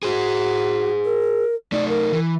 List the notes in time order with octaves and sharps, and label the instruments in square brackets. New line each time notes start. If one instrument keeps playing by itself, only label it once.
[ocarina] F#4 [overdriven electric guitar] G#4 C5
[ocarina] A#4
[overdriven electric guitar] A3 D#4 [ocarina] D5
[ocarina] A#4
[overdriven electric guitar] E3